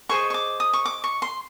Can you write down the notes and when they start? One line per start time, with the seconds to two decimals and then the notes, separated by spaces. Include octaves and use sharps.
0.09 G#4 C5 D#5 C#6
0.30 C#6
0.34 D6
0.60 D#6
0.73 C#6
0.85 D6
1.04 C#6
1.22 C6